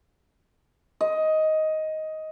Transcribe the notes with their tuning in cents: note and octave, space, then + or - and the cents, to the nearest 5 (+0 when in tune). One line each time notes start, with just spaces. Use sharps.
D#5 +10